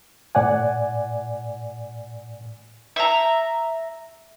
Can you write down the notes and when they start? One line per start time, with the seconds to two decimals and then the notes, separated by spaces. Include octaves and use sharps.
0.35 A2 D5 F#5 G#5
2.96 E5 A#5